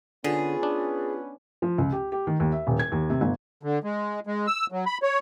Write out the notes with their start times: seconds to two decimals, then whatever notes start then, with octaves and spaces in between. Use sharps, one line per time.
0.24 D3 B3 C#4 F4 G#4 B4
0.63 D4
1.62 F3
1.78 C#2
1.92 G4
2.12 G4
2.27 D#3
2.40 D#2
2.52 E5
2.67 D#1
2.79 G#6
2.92 D#2
3.10 C3
3.21 G1
3.63 D3
3.84 G#3
4.27 G#3
4.47 E6
4.72 F#3
4.86 B5
5.03 C#5